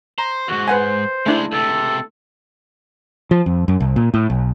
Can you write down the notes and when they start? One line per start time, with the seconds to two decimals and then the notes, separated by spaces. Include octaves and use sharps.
0.18 C5 A#5
0.48 D#2 G#2 F#4
0.68 B4 C5 F#5 G#5
1.26 C#3 G#3 A3 D4 E4
1.52 C#2 C3 A4
3.31 F3
3.46 F2
3.68 F#2
3.80 C2
3.96 A#2
4.14 A2
4.30 B1